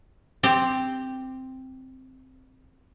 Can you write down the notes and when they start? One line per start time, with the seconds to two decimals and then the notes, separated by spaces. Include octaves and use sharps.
0.43 C4 G4